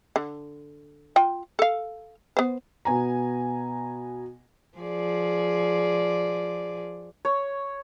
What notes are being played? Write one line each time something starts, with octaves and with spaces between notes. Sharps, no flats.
D3
F4 G5
A4 F5
B3 C5
B2 B3 G#5 A#5
F3 G#4 D5
C#5